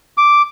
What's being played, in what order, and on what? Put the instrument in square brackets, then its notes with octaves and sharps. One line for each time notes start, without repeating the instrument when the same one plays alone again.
[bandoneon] D6